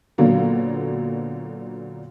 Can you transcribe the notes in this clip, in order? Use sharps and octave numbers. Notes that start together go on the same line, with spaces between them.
A#2 D3 F#3 A#3 B3